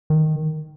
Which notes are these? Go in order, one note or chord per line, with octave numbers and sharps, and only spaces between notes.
D#3